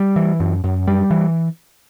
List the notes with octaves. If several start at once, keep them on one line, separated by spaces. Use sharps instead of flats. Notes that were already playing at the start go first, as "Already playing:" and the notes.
Already playing: G3
E3
F#2
F#2
G3
E3